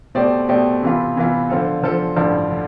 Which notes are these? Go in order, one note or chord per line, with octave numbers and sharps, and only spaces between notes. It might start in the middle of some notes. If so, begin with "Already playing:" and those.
B2 A3 C4 G4 D5
B2 A3 C4 G4 D5
C3 E3 B3 F4
C3 E3 B3 F4
D3 F3 C4 F4 A4
D3 F3 C4 F4 A4
A1 G2 D3 F3
D3